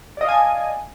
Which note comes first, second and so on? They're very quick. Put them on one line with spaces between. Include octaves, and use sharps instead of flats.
D5 D#5 F5 G#5 A5